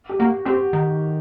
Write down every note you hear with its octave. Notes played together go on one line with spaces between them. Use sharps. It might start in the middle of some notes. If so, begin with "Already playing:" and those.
G4
A#3 F#4
C4 G4
D#3